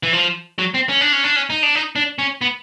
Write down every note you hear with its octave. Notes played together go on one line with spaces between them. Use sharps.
E3
F3
F#3
C4
C#4
D4
C#4
D4
C#4
D#4
D4
D#4
D4
C#4
B3